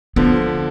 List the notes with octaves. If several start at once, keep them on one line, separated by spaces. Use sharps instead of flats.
D3 F3 B3